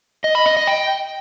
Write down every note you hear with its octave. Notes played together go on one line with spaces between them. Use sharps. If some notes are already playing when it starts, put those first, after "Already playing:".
D#5
B5
D#5
D#5
G5